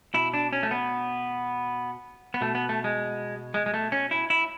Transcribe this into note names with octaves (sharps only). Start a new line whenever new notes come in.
B2 E4
D4
C#4
A3
B3
B3
B2 A3
B3
A3
G#3
G#3
G#3
A3
C#4
E4
E4